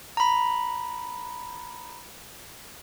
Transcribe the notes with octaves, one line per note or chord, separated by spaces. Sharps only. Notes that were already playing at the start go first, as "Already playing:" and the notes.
A#5 B5